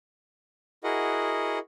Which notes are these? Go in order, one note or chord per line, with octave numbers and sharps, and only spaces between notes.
E4 F#4 G#4 A#4 D#5 F#5